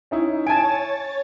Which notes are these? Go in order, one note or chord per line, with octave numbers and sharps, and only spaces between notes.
C#4 D#4 E4
C#5 G#5 A5 G#6 A6 D7